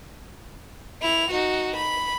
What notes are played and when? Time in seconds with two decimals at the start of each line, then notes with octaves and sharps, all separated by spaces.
1.01 E4 F7
1.31 D#4 F#4
1.76 B5